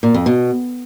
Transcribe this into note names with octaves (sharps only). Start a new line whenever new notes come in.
A#2
F2
B2